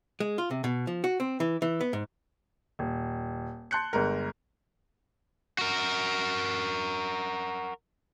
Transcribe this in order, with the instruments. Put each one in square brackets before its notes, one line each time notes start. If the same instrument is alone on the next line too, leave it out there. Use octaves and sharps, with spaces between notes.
[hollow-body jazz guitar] G#3
F4
C3
B2
F3
F#4
C4
E3
E3
B3
G#2
[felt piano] D#1
A5 C6 F#6 G6 C#7
G1 G#3 A#4
[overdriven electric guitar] F#4 A#4